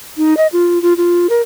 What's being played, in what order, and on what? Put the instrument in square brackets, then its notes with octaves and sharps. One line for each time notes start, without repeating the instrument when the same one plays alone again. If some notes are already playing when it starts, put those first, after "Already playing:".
[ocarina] D#4
D#5
F4
F4
F4
A#4